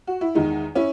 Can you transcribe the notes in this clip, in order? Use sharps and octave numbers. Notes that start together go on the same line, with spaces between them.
F#4
E4
E2 D#3 G#3 D#4
C#4 E4